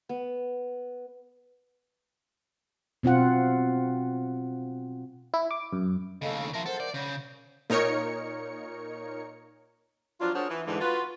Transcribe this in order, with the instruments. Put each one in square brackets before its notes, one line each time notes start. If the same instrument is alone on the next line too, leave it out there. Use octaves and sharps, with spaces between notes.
[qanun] B3
[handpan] B2 C4 F4 F#5
[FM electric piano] E4
D6
F#2
[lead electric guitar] D#2 C#3 [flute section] A4 D#5 F5
[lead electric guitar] F3 A#4 [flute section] E5 A5 C6
[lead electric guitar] A4 [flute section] A#4 C5 F#5
[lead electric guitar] D5
[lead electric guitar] C#3 [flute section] G6
[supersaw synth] A#2 D#4 A#4 C#5 C#7
[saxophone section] F3 F#3 D4 F4
D4 F#4 G#4 A#4 C5 C#5
E3
G#2 D3 E3
F4 F#4 B4